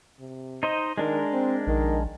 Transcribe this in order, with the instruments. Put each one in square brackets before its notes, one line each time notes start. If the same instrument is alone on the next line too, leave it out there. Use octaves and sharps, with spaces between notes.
[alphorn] C3
[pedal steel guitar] D#4 C5 D#5
[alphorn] D#3 [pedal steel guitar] G#3 D4 A#4
[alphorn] C4
[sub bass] A#1 [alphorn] D#3